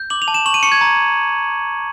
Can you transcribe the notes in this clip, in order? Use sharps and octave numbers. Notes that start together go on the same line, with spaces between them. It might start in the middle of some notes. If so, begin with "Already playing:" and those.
Already playing: G6
D6 F#7
F7
A5
E7
C#6 F#7
D#7
C#6 C#7
G#6
A#5